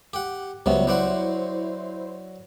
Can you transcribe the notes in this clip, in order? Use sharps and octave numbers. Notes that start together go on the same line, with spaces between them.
G4 F#5
C#2 C3 F#3 G3 B3
F#3 E4 C5 D5 F#5